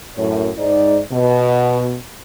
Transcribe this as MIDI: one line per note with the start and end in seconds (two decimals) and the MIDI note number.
0.17 0.50 42
0.17 0.50 45
0.17 0.50 73
0.58 1.00 44
0.58 1.00 63
0.58 1.00 74
1.12 1.94 47